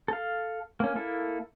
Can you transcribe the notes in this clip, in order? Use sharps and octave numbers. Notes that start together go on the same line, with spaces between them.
A4 F5
A#3 C#4
A#3 E4 A4